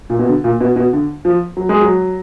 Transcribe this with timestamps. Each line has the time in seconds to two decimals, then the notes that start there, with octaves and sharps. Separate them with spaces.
0.10 A#2
0.19 B2
0.28 D3
0.44 A#2
0.61 B2
0.76 B2
0.93 D3
1.25 F3
1.57 F#3
1.69 G#3
1.81 F#3